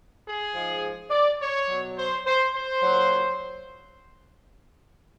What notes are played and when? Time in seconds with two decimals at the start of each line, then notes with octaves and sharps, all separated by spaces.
0.26 G#4
0.54 G#2 F3 G#3
1.10 D5
1.40 C#5
1.68 B2 F#3
1.97 C5
2.26 C5
2.54 C5
2.82 A#2 F#3